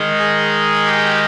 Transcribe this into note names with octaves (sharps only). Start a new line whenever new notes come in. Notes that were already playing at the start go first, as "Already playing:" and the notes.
Already playing: D#3 G#3 D#4
G#4
G4